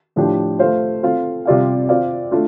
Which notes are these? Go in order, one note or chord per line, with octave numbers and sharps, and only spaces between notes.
A2 F3 D4 G4
A3 F4 C5 F5
C4 F4 A4 F5
C3 G3 F4 D5 F5
C4 F4 D5 F5
A3 D4 F4